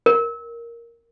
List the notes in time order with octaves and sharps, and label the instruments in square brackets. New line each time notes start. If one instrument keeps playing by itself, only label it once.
[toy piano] A#4